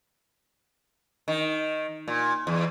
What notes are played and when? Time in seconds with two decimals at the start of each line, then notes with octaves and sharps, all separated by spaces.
1.28 D#3
2.08 A#2
2.47 E2